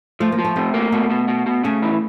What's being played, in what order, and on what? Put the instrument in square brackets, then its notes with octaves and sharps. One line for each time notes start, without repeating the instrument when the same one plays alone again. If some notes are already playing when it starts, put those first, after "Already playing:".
[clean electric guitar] F3 [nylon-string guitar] A3
[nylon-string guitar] A#3
[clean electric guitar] F3
[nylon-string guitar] A3
[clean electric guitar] C3 [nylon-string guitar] A3
[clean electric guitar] A#3
[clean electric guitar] B2 [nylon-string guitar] A3
[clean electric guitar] B2
B2
B2
[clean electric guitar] C#3 [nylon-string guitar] A3
[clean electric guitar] E3